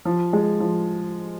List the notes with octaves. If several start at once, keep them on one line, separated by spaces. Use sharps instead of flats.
F3
G#3
F3